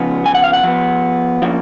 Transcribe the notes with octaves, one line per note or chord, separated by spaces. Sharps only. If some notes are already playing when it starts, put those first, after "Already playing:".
Already playing: C#3 F3 B3
G#5
F#5
F5
F#5
F3 B3
F3 A#3 C#4